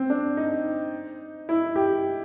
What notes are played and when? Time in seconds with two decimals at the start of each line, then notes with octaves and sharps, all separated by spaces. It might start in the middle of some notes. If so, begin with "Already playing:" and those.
Already playing: C4
0.10 D4
0.37 D#4
1.49 E4
1.76 G4